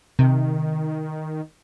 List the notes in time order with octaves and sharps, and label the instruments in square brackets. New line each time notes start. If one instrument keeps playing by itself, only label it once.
[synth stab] C3 [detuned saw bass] D#3